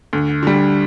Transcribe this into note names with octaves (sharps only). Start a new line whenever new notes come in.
D2
D3 G3